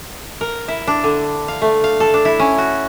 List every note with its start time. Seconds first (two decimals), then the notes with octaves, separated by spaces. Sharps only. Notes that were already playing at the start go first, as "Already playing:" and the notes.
0.41 A#4
0.68 E4
0.87 D4
1.04 D3
1.48 F5
1.62 A3
1.84 F5
2.00 A4
2.14 D4
2.25 E4
2.39 C#4
2.58 F#4